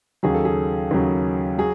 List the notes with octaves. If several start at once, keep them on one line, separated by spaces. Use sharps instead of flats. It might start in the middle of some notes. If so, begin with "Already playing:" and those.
D#2 C#3 F#3 G#4
A4
G#4
D#2 C#3 F#3
F#3 G#4